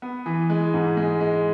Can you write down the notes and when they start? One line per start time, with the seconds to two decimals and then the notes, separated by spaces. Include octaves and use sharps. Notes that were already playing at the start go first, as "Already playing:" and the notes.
0.02 B3
0.26 E3
0.50 G#3
0.74 G#2
0.97 G#3
1.20 G#3